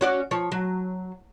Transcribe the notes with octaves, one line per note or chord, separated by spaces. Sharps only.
C#4 F#4 D5
F3 C#5
F#3